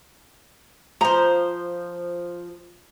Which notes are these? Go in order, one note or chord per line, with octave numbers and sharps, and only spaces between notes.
F3 C5 A#5